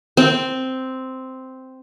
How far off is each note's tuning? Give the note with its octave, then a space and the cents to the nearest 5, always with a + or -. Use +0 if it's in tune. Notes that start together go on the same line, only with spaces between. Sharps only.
C4 -5